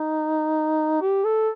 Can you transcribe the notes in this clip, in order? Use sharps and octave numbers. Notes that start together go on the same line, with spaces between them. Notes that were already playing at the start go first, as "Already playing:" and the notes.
Already playing: D#4
G4
A4